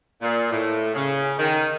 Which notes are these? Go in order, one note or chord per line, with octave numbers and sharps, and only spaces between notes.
A#2
A2
C#3
D#3